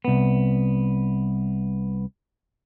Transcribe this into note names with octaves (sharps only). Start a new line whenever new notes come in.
C2 B3